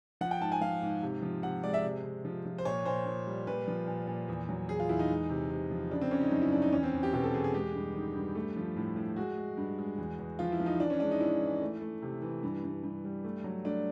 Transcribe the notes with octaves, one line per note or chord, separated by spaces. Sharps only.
F3 F#5
G5
G#2 A5
G#5
F3 F5
G#2
C3
F3
C3 F#5
G#3 D5
E5
C3
C3
F3
F3
C5
A#2 C#5
A#2 C5
A#2
G3
A#2 B4
F3
A#2
A#2
E2
F#3
E2 G#4
F4
E2 E4
D#4
G#3
C3
C3
F3
C#3 D4
C4
C#3 C#4
D#4
F#2 D#4
E4
F#2 D4
D#4
E2 C#4
C4
E2
G4
B2 G4
A4
E2 G#4
G#4
G#3 G4
G2
D#3
G2
A3
F3
A2
A2
G#3 F#4
G#3
G2
G#3
E2
E2
F3 F4
E4
F3
D#4
E3 D4
C#4
G#3 D4
D#4
G#2 E4
E3
A3
A3
C3
E3
G2
G2
G2
G3
A3
F#3
A3 D4